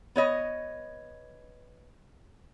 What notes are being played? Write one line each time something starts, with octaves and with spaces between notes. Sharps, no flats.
B3 C#5 D#5